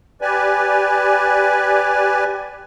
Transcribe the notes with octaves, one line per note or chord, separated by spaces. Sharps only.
G4 B4 D5 G#5